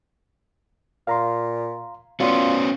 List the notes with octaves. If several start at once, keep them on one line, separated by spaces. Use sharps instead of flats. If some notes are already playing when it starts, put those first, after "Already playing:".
A#2 F5 A#5 C6
B3 C#4 F4 F#4 D5 C6